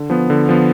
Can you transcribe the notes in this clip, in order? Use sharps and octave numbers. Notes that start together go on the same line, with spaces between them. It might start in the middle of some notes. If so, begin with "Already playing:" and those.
Already playing: D3
F3 B3
D3
F3 B3